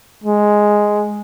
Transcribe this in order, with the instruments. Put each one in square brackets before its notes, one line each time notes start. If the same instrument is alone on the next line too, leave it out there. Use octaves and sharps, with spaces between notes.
[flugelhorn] G#3